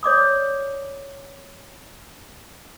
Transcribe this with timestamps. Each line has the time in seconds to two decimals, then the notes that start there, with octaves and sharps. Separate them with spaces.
0.03 C#5 D5 D6 D#6